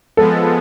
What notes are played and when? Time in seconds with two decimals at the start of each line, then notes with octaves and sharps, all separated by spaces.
0.17 F3 G#3 B3 A4